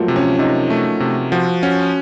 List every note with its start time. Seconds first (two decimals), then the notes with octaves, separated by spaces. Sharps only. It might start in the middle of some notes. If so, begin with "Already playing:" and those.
Already playing: F3 F#3 A3 A#3
0.08 C3
0.16 C#4
0.39 C3 D#4
0.70 A3
1.00 C3
1.32 F3 F#4
1.63 C#4 F#4